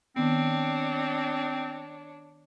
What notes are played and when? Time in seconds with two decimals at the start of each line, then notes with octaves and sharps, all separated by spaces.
0.16 D#3 B3 C4 D4 C#5